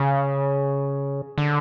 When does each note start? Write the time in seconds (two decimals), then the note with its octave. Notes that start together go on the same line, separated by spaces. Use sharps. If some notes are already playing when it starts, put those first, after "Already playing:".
Already playing: C#3
1.38 D3